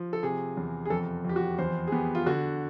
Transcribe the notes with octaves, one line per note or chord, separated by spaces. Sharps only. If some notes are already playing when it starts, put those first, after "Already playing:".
Already playing: F3
A4
C3 G#4
E2
G#4
F2 A4
F2 G4
F#4
E2 C5
G#4
B3 G4
F4
D3 F#4